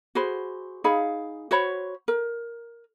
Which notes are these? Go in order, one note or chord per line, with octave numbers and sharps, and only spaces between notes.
F#4 G#4 C5 B5
D#4 G#4 F5 B5
F#4 C5 C#5 B5
A#4